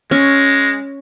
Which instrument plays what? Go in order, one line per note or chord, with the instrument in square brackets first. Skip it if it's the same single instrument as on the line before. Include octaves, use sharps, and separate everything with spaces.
[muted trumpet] G#3 [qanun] C#4